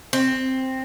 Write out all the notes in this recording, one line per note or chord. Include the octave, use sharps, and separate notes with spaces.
C4